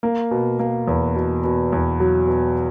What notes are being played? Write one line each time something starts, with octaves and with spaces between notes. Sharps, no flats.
A#3
B2
A#3
E2
B2
B2
E2
F#3
B2